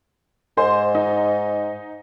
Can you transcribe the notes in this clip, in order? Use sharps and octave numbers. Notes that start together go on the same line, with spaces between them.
G#2 C5 G#5 C6
D#4